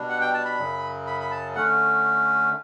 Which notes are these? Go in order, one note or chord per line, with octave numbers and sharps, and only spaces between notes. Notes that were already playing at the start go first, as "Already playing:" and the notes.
Already playing: B2 G3 D4
F#5
G5
A5
B5
F#2 C#3 F#3
B5
B5
A5
D3 A3 C#4 F#5